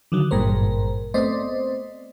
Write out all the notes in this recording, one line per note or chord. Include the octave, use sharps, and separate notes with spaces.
D3 D#3 F#3
G#1 G2 A#2 A#4 C5
A3 B3 C4 C5 D5 D#5